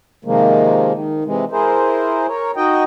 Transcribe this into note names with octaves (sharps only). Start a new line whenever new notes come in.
C3 D#3 F3 G#3 A#3
D#3
C3 E3 G#3
E4 G#4 A#4 C5
A#4 C#5
D#4 F#4 D#5 G5